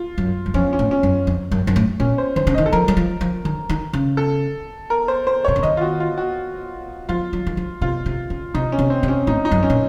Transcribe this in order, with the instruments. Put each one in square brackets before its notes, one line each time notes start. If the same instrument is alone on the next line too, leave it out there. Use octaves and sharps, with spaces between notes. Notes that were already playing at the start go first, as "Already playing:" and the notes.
Already playing: [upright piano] F4
[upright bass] F#2
F#2
[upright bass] F2 [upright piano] C#4
[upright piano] C#4
[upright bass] A2
[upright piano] C#4
[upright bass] F#2
F2
F#2
F#2
A2
[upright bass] A#2 [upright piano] C#4
[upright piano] C5
[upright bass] D#3 [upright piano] C5
[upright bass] C#3
[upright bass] D#3 [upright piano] D#5
[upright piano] A4
[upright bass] F3 [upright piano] A#4
[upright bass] F#3
F3
F3
D#3
D#3
C#3
[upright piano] A4
A#4
C5
C5
[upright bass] C3 [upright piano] C#5
[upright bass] C#3
[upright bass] D#3 [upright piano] D#5
[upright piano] F4
F#4
F4
F#4
[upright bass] F3 [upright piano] F4
[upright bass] F#3
D#3
F3
[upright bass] C3 [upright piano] F4
[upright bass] C3
C#3
[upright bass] C3 [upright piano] D#4
[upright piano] C#4
[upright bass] C3
[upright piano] C4
[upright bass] C3
[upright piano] C#4
[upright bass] A2 [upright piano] D#4
[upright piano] D#4
[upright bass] F#2
[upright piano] C#4
[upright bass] A#2